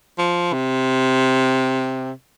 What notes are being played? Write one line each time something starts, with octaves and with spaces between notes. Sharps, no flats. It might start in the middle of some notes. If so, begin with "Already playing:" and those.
F3
C3